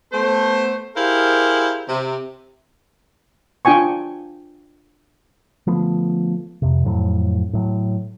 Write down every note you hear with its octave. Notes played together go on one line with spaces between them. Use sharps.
A3 B3 A4 C5
E4 G4 G#4 A#4 C5 F5
C3
D4 F4 G5 G#5 C#6
D3 F3 A3 B3
F2 C3
F2 A2 F#3
A2 F#3